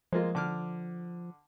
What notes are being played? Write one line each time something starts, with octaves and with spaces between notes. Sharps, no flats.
F3 G#3 A#3 F4
D3 D6 F6